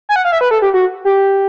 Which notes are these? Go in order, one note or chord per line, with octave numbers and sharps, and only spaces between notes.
G#5
F#5
F5
E5
B4
A4
G4
F#4
G4